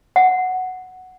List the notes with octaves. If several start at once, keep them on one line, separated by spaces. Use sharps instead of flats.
F#5